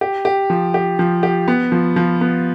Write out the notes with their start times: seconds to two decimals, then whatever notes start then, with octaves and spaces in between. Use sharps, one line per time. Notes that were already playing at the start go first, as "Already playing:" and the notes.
0.01 G4
0.25 G4
0.50 F3
0.74 G4
0.99 F3
1.23 G4
1.48 B3
1.72 F3
1.96 F3
2.21 B3